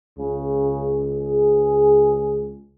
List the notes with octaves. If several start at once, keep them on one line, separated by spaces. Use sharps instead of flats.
C#2 C#3
G#4